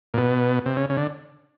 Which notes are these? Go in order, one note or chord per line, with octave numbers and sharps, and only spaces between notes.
A#2
B2
C3
C#3
C#3
D3